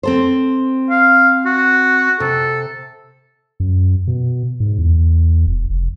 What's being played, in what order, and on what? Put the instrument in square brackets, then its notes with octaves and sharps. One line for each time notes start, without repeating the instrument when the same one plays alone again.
[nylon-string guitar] C4 A4 C5
[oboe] F5
F#4
[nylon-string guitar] C3 [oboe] A4
[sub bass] F#2
B2
G#2
E2
E1
F1